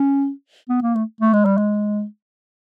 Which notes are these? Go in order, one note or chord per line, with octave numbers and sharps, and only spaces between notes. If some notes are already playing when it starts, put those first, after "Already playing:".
Already playing: C#4
B3
A#3
A3
A3
G#3
G3
G#3